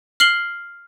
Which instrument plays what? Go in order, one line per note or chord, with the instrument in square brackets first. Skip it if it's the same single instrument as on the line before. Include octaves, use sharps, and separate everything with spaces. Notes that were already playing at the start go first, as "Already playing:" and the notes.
[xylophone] F6 C7 F#7 G7